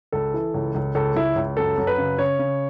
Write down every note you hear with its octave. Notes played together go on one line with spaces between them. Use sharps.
C#2 A4
E3
C#2
C#2
C#2 A4
C#2 E4
C#2
F#2 A4
F#2
B4
C#3
C#3 C#5
C#3